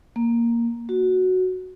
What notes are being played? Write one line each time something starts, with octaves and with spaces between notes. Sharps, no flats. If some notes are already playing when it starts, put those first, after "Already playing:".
A#3
F#4